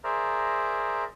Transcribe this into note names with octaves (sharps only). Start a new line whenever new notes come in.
G#4 A#4 C5 D5 E5 A#5